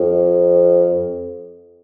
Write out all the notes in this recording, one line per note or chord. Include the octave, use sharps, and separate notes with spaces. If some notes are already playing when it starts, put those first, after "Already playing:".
Already playing: F2